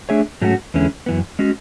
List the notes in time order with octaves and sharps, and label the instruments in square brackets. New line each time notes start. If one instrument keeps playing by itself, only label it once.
[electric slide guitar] A3 D4 G#4 C#5 E5
G#2 F#3 A3 C#4 F#4
E2 D3 G#3 C#4 E4
F#2 E3 B3
G#3 C#4 F#4